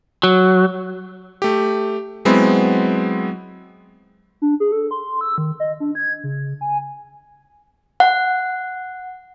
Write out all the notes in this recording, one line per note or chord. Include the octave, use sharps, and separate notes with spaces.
F#3
A3 G4
F#3 G#3 B3 C4 E4
D4
G#4
A4
C6
E6
D#3
D#5
D4
G#6
C#3
G#5
F#5